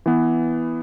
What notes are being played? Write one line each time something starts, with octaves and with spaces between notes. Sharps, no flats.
E3 B3